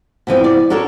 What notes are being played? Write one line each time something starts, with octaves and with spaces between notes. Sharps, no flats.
B2 E3 F3 C4
D5
D4 F#4 A4 A#4 C#5